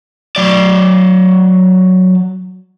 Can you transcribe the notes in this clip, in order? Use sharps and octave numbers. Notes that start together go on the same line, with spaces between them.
F#3 D5